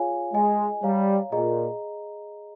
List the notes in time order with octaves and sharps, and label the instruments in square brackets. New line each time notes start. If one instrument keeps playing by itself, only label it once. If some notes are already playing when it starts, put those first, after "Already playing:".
Already playing: [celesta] F4 G#4 C#5 F5 G#5
[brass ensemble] G#3 [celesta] G#4 D#5 G#5
[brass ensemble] G3 [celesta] C#5 F5 A#5
[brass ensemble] A#2 [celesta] G#4 D#5 A#5